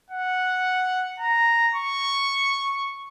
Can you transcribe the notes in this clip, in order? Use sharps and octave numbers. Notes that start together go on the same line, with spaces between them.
F#5
A#5
C#6